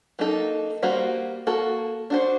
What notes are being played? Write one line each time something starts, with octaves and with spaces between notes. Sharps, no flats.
F#3 A#3 D#4 A4
G3 A#3 F#4 C5
A#3 F#4 A4
D4 F#4 C5